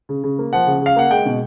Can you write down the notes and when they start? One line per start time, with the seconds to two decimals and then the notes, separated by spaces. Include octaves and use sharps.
0.09 C#3
0.24 C#3
0.39 A#3
0.53 F3 F#5
0.67 C#3
0.81 C#3 F5
0.96 A#3 F#5
1.11 G#3 G5
1.26 B2